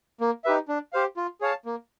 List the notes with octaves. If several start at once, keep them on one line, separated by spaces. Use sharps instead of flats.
A#3
D#4 G4 B4 E5
D4
G4 C5 F5
F4
G#4 C#5 F5 A5
A#3